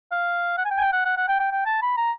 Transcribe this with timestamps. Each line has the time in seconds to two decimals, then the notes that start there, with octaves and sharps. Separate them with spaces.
0.12 F5
0.58 F#5
0.65 G#5
0.71 G5
0.78 G#5
0.81 G5
0.93 F#5
1.05 F#5
1.17 F#5
1.29 G5
1.40 G5
1.52 G5
1.66 A5
1.82 B5
1.97 A#5